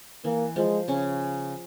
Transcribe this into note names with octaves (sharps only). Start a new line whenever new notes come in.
E3 A#3
F3 G#3
C#3 C#4